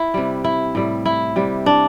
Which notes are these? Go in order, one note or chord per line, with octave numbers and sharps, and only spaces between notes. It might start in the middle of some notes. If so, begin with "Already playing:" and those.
Already playing: E4
C3 G3
E4
A2 G3
E4
C3 G3
D4